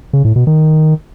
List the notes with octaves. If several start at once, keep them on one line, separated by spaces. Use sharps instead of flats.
C#3
A2
B2
D#3